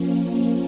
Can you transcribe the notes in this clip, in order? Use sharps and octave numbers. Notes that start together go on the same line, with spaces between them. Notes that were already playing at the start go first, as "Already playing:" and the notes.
Already playing: F3 A#3 C#4